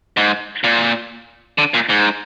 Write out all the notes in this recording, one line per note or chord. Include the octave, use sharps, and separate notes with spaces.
G#2
A#2
D3
A#2
G#2